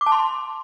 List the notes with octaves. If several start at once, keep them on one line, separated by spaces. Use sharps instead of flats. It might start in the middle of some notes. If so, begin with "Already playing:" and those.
D6
A5
C6